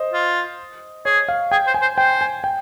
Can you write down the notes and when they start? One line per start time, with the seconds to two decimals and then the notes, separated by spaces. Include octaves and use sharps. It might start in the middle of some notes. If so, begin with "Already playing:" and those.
Already playing: C5 D#5
0.13 F4
1.05 G#4 C#5
1.29 F5
1.52 G#4 G5
1.67 C5
1.74 G#5
1.82 C5
1.98 C5 G5
2.21 G#5
2.44 G5